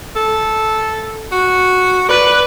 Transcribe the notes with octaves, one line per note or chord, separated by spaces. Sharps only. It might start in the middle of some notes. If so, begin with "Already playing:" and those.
A4
F#4
B4 D5